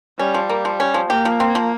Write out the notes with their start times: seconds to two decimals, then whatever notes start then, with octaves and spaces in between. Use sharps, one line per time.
0.19 G3 C#4
0.34 F3
0.50 A#3
0.65 F3
0.80 C#4
0.94 F3
1.10 A#3 G4
1.25 F3
1.40 C4
1.55 F3